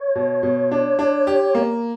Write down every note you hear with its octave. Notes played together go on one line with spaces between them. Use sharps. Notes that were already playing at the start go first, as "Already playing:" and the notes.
Already playing: C#5
B2
B2
D4
D4
G4
A#3